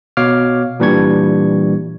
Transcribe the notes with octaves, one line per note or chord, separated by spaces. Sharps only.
B2 C#5 F5 D6 F6
A#2 E3 G3 D4 C#6 G#6